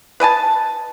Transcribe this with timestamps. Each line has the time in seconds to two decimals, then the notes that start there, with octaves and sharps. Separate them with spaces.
0.20 B4 D#5 G#5 A5